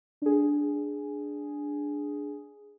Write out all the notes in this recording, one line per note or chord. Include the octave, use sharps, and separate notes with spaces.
D4 G#4